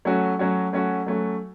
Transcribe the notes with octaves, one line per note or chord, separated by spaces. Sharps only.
F#3 A3 C#4 F#4
F#3 A3 C#4 F#4
F#3 A3 C#4 F#4
F#3 A3 C#4 F#4